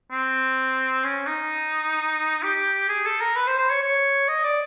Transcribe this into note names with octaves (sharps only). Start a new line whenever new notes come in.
C4
C#4
D#4
G4
G#4
A4
A#4
B4
C5
C5
C#5
C#5
D#5
D5